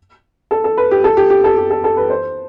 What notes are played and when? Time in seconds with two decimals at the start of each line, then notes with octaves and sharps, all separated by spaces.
0.51 A4
0.64 A4
0.77 B4
0.91 G4
1.04 A4
1.17 G4
1.30 G4
1.44 A4
1.57 G4
1.70 A4
1.84 A4
1.97 B4
2.10 C5